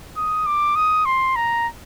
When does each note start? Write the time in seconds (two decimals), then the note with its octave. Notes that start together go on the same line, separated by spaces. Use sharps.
0.17 D#6
0.46 D6
0.76 D#6
1.06 C6
1.36 A#5